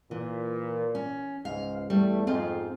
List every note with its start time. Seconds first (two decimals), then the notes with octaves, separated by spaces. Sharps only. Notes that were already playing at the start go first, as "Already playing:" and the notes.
0.11 A#2 E3
0.95 C#4
1.45 C#2 G#2 F5
1.90 E2 G3 A3
2.27 F2 G#2 C4 F4